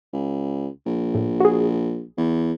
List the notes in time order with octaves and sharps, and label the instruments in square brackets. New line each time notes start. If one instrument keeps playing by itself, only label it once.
[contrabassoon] C#2
A#1
[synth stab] A2
F#4 G#4
[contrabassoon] E2